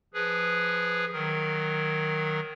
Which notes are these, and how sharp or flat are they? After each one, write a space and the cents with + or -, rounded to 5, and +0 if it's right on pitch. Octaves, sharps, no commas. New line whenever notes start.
F3 +0 G#4 +0 B4 +0
D#3 +0 F#3 +0 A#4 +0